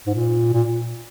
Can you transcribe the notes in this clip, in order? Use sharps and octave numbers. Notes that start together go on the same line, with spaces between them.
G#2
A#2
A#2